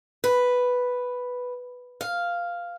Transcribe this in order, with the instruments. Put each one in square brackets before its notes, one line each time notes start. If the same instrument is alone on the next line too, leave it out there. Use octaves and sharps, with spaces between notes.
[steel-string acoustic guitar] B4
F5